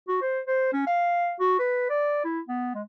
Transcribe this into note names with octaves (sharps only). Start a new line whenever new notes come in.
F#4
C5
C5
C#4
F5
F#4
B4
D5
E4
B3
G#3